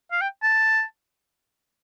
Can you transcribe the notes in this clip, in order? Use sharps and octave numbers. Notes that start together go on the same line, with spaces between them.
F5
G5
A5